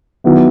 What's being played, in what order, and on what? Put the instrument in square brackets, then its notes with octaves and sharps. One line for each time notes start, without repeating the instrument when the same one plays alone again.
[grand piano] D#3 F#3 B3 E4